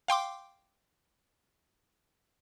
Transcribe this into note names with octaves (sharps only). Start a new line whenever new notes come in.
F5 G5 C6 D6